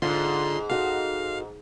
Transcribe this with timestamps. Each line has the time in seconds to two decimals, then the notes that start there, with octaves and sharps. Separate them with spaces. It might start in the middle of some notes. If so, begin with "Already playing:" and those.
0.02 G#2 D3 F4 C6
0.70 D#4 F#4 A4 F5